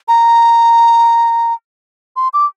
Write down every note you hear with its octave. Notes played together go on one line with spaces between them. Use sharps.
A#5
C6
D6